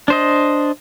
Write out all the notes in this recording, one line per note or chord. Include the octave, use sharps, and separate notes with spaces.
D4 C5 D#5